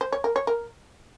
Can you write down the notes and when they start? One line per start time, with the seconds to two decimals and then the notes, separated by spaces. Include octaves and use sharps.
0.01 C5
0.12 C#5
0.24 A#4
0.36 C#5
0.47 A#4